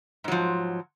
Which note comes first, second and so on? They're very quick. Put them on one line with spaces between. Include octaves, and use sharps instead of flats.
G#2 F#3 F3